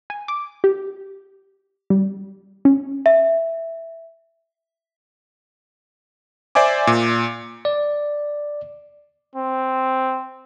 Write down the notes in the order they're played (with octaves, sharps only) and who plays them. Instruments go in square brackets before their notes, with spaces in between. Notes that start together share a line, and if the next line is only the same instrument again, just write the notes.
[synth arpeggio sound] G#5
D6
G4
G3
C#4
[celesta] E5
[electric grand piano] C5 D5 E5 G#5 D6
A#2
[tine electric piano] D5
[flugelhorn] C4